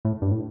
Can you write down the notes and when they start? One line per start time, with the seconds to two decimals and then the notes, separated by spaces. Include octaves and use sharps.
0.05 A2
0.22 G2
0.32 A2